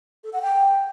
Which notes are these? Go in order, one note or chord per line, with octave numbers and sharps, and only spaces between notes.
A4
F#5
G5